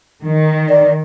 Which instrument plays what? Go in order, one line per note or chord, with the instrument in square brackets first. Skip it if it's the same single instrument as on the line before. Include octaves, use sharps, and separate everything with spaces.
[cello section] D#3
[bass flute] D5